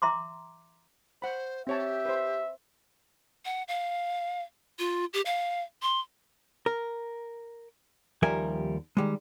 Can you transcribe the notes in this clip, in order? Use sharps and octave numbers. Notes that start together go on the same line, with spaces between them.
E5 A#5 C6 D6
C5 F#5 B5
C4 G4 C#5 E5 A5
B4 C5
F#5
F5
F4
G4
F5
C6
A#4
D#2 F3 G3 A#4 E5 G#5
D#3 G3 G#3